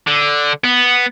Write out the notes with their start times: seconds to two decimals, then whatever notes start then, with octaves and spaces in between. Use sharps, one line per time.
0.07 D3
0.64 B3